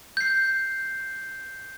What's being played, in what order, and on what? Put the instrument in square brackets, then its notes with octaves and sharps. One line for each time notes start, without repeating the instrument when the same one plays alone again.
[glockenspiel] G6 C7